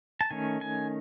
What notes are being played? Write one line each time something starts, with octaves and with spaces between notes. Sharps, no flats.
A5
D#3 A3 C#4 G#5
G#5